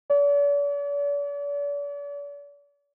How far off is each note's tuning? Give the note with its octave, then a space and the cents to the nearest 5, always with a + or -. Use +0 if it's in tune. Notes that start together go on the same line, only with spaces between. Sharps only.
D5 -45